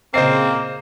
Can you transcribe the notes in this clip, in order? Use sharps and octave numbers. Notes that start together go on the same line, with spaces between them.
A#2 C#3 A#3 C4 C5 D#5 C7